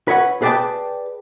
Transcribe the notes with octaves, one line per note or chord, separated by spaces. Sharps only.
B4 C#5 E5 F#5
G#4 B4 D5 D#5 G5 A5